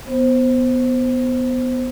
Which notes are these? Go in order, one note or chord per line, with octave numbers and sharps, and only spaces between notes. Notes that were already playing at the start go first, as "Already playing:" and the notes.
B3 C5